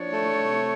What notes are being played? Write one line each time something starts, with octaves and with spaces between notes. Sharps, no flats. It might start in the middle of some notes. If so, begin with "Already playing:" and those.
Already playing: F3 D4 C#5
A3
C3